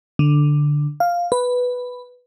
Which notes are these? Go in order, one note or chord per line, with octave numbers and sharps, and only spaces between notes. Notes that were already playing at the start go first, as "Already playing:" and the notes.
D3
F5
B4